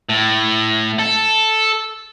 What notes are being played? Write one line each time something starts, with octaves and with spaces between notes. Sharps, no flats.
A2
A4